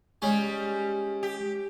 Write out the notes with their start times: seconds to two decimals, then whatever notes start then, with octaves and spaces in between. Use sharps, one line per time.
0.22 G3 G#3 C#4
1.23 G4